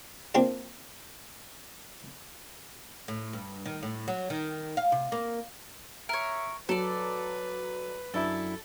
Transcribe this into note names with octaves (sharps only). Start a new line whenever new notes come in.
A#3 C4 D4 F4 G4 D5
A2
G2
D#3
A2
F#3
D#3
F5
C3
A#3
A#4 C#5 E5
F#3 A4 B4 D5
F#2 D4 E4 A4